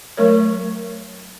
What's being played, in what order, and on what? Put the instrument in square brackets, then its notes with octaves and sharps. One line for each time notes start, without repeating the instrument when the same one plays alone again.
[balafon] F#3 A3 A#4 C#5